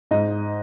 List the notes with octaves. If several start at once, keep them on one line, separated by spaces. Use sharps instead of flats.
G#2 D#5